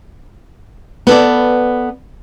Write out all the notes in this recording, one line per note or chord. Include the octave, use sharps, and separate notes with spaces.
B3 A4 D5